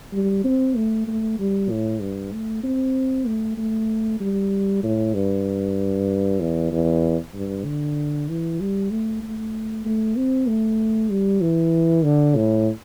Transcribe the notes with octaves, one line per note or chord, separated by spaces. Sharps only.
G3
C4
A3
A3
G3
A2
G2
A3
C4
A3
A3
G3
A2
G2
E2
E2
G2
D3
E3
G3
A3
A3
A3
C4
A3
G3
E3
D3
A2